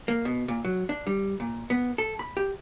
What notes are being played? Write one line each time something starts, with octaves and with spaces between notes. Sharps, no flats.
A#3
B2
A#2
F#3
D4
G3
A#2
B3
A4
B5
G4